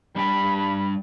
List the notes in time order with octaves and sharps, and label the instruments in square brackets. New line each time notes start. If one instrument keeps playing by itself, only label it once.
[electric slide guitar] G3 D4 G5 [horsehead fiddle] B5